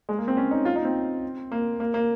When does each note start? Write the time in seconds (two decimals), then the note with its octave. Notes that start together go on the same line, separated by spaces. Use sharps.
0.09 G#3
0.18 A#3
0.28 C4
0.37 C#4
0.51 D#4
0.65 F4
0.76 D#4
0.85 C4
1.52 A#3
1.80 A#3
1.94 A#3